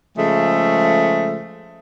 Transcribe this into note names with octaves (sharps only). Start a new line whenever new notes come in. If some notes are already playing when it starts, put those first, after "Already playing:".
C#3 F3 G#3 A3